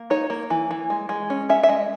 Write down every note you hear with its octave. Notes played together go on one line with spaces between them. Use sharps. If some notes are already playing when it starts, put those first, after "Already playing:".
Already playing: A#3
D#4 C#5
A#3
E3
E3
G#3
G#3
C#4
C#4 E5
E5
G#3 D#5